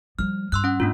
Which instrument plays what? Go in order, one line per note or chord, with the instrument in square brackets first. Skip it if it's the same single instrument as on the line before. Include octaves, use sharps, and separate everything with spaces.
[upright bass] F3 G3 [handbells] F6
[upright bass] G2 [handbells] C6 E6 F#6
[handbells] C#4 F#5
[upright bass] G#2 [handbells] A#3 D4 F4